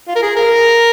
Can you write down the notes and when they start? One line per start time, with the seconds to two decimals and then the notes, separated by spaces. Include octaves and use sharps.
0.08 F4
0.16 A#4
0.23 G#4
0.36 A#4